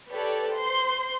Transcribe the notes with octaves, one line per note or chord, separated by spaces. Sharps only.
G4 A4 B4 C#5 D5
C5 C6